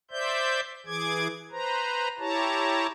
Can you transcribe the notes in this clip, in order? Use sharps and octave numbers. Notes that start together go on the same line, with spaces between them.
C5 D5 E5 G6
E3 G#4 D6 G#6
B4 C5 A#5
E4 G4 C#5 A5 A#5